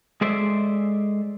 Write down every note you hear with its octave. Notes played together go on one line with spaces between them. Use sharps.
G#3 G#4 A4 C5 D5 E5